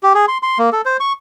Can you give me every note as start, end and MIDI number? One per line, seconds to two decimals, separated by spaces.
0.03 0.13 67
0.15 0.26 68
0.28 0.38 84
0.43 0.58 84
0.59 0.70 58
0.72 0.82 69
0.85 0.97 72
1.00 1.13 85